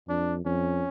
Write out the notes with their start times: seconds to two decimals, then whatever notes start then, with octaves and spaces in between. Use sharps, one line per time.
0.08 F2 D4
0.45 F2 C#4